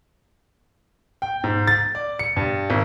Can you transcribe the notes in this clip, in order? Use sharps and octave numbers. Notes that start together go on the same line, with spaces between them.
G5
G#2
A6
D5
C#7
G2
G#1